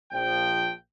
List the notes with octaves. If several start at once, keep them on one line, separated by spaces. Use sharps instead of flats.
A#1 F3 G5